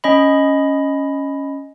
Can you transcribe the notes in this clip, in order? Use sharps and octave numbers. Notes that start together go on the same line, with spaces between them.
C#4 D#5 B5